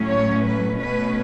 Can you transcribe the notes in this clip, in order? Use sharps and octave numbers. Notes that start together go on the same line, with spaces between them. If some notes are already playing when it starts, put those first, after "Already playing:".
Already playing: A2 F#3 C#4
C#5
B4
B2 A3 C#4 B4